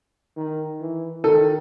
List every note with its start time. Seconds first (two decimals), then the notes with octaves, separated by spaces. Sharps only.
0.36 D#3
0.81 E3
1.24 D#3 A4